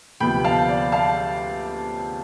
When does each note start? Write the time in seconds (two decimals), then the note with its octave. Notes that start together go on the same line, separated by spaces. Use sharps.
0.20 D2 C3 F3 B3 G5 B5
0.44 F5 A5
0.69 D5
0.92 F5 A5